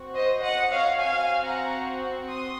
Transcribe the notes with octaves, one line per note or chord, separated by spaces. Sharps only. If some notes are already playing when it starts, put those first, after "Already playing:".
Already playing: C4 F#4
C5 D#5
D#5 F#5
C#5 F5
C4 F#4 F5 G#5
F#5 A#5
C6 D#6